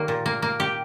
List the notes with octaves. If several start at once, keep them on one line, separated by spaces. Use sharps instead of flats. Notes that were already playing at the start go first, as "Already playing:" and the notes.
Already playing: D#3 G3 A#3
A#2
A#3
A#3
G4